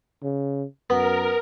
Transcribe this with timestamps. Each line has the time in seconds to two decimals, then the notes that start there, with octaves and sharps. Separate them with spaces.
0.23 C#3
0.90 F#2 B3 A#4